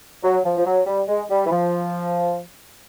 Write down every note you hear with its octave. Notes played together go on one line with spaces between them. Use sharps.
F#3
F3
F3
F#3
G3
G#3
G3
E3
F3